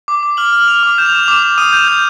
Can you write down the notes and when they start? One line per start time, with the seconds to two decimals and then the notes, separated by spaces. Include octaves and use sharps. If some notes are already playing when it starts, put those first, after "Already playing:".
0.08 D6
0.23 D6
0.37 F6 F#7
0.53 F6
0.58 F#7
0.68 F6 F7
0.83 D6
0.98 G6 E7
1.06 F7
1.13 D6 E7
1.23 F7
1.28 D6 E7
1.43 D6
1.58 D#6 D#7
1.68 D#7
1.73 G6
1.78 E7
1.88 G6